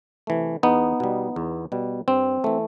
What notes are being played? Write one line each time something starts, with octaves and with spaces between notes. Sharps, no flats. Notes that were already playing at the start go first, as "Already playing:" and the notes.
C3 E3 A3
E2 B3 D#4
B2 G3
E2
B2 G3
G2 C4
E3 A3